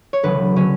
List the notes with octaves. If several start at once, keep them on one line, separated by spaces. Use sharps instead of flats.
C#5
E1 D2 C#3 F#3 B4
D3 F#3 C#4